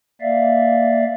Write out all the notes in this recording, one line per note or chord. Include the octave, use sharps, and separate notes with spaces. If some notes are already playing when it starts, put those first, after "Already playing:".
A#3 D5 E5 F5